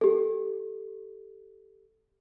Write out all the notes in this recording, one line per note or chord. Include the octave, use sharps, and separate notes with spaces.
G4 A4